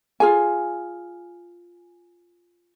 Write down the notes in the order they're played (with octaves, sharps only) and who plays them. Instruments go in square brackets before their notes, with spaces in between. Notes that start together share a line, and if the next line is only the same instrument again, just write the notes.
[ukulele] F4 G#4 G#5